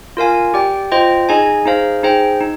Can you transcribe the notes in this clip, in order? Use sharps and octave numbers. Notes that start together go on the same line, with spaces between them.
F4 A#4 F5 G#5
G4 D5 G5
F4 C5 D#5 G5
D#4 G#4 D#5 G#5
D#4 G#4 C5 F5
D#4 G#4 C5 G5
D#4